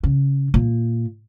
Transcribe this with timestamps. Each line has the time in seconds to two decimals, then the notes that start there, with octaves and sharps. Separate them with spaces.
0.03 C#3
0.54 A#2